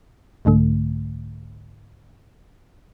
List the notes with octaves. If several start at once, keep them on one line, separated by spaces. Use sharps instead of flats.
C2 G#2 D3 A3